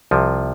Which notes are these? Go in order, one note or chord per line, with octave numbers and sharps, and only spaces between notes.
C2 C3 F3